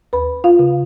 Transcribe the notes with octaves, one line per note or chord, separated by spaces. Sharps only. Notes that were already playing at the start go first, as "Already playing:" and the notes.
D#2 B4 B5
F4 F5
C#3